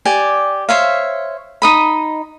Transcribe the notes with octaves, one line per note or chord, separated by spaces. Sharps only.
G4 D5 G#5
C5 C#5 E5 F5
D#4 D#5 B5